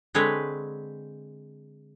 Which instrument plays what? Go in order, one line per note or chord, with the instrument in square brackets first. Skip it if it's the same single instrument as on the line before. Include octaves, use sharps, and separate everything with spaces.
[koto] D3 G#3 C4 B4 C#5